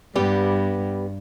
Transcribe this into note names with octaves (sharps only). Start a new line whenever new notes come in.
G2 G3 B3 G4